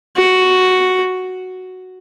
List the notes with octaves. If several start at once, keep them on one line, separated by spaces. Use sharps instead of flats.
F#4